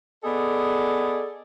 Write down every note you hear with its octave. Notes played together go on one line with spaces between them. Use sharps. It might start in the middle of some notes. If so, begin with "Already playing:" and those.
B3 G#4 A4 D5 D#5